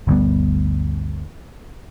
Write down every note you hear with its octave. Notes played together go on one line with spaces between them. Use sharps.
G1 D2 G3 B3